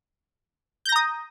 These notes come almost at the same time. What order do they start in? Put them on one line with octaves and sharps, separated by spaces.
G6 A#6 A#5 D#6